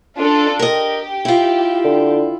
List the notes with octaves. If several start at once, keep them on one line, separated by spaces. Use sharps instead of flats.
D4 F4 A4
G4 A#4 D#5
E4 F4
D3